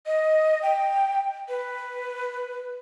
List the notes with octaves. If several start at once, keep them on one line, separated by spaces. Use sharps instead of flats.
D#5
G5
B4